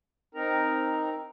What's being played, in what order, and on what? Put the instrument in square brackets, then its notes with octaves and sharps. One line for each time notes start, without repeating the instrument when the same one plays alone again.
[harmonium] C4 D#4 A#4 A#5